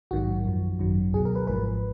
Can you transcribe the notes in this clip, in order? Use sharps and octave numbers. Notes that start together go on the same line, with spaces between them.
A#1 G#2 D#3 F#3 F#4
F#2 F3
G#1 F#2 D#3 F#3
C#2 B2 F#3 G#4
A#4
B4
G#1 G#2 F3 B4